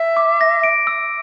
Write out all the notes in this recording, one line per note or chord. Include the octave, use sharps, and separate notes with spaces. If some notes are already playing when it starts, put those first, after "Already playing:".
Already playing: E5
D6
A#6
D7
E6